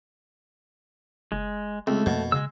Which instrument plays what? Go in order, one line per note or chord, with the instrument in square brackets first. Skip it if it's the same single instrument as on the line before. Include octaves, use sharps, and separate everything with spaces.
[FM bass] F#1 [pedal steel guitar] G#3
[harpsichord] C#2 [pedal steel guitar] A3 [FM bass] C4
[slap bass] F2 A#3 [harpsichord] B2
[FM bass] C#3 [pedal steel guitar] G#3 E6